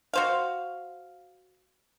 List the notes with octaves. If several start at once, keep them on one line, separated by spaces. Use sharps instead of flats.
F#4 C5 F5